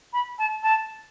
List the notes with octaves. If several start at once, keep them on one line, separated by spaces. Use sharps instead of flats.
B5
A5
A5